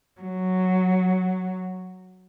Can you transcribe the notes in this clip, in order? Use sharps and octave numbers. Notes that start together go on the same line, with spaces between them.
F#3